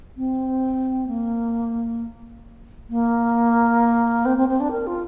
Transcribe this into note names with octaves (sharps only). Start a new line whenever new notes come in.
C4
A#3
A#3
C4
C4
C4
D4
A#4
F4